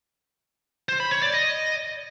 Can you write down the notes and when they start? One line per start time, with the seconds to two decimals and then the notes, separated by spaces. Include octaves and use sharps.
0.89 C5
1.00 B5
1.11 C#5
1.22 D5
1.34 D#5